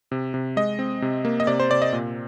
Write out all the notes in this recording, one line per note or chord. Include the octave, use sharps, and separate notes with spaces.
C3
C3
G#3 D#5
C4
C3
A#3
D#5
C3 D5
C5
C3 D5
D#5
A#2